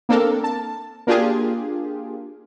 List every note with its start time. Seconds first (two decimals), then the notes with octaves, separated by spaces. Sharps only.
0.09 A#3 C4 D4 A4 A#4
0.44 A5
1.07 A#3 D4 F4 G4 G#4